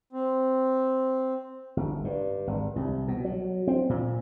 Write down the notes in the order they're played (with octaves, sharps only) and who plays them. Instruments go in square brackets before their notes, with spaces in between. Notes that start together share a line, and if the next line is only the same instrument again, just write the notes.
[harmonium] C4
[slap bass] G1
G2
G#1
C2
B2
F#3
C4
A#2